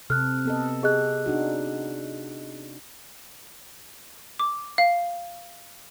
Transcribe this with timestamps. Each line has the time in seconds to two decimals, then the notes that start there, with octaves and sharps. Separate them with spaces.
0.10 C3 C4 A4 F6 F#6
0.45 B3 A4 D#5
0.83 G4 G#4 D#5 F#6
1.26 D4 D#4 F#4
4.39 D6
4.78 F5